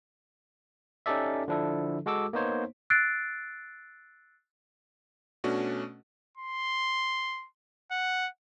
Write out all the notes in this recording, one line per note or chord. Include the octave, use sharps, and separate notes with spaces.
C#4 D#4 G4 A4 D5 E5
D3 F3 D4 E4 A4
G#3 F#4 A4 D6 E6
A#3 B3 D#4 C5 C#5
E6 F#6 A6 C7 D7
B2 A3 C#4 D4 F#4
C6
F#5